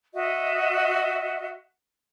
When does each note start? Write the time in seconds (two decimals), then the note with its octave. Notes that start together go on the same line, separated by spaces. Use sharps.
0.14 F#4 D#5 E5